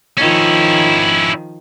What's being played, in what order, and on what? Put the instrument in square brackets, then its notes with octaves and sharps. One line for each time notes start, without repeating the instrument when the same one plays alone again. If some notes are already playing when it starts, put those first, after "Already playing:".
[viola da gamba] D#3 F3 [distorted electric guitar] C#4 E4